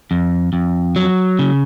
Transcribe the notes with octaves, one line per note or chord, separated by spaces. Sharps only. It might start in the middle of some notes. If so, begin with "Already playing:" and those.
F2
F2
F#3
C#3